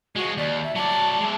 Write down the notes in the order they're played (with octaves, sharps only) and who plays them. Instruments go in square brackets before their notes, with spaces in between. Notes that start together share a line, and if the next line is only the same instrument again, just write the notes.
[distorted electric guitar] F3 G#3 [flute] F#4
[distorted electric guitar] D#2 [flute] D5
[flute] E5
[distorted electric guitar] F#3 D5 [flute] A5
[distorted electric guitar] G#3 E5